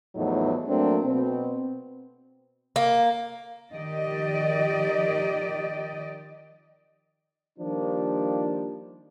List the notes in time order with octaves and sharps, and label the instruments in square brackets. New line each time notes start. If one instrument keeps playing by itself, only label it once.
[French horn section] E2 A2 F3 F#3 D#4
F#3 A3 A#3 C4 D4
B2 C4
[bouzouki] A#3
[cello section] D#3 F3 G4 D5 D#5
[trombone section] D#3 F3 G3 A#3 D4